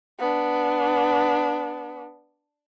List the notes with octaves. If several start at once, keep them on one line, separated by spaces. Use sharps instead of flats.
B3 D4